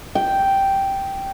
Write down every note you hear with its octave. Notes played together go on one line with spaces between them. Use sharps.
G5